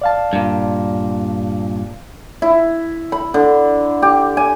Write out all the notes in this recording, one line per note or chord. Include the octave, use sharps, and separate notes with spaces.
D5 F5 A5
G2 A#2
E4
B5
D3
G4
G#5